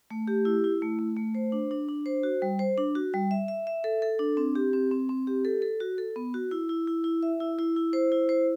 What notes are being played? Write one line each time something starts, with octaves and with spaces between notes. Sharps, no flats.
A3
G4
E4
E4
A3
A3
A3
C5
D4
D4
D4
C5
F#4
G3
C5
D4
F#4
G3
E5
E5
E5
A4
A4
D4
C4
G4
C4
C4
C4
G4
A4
A4
F#4
A4
B3
F#4
E4
E4
E4
E4
E5
E4
E4
E4
C5
E4
C5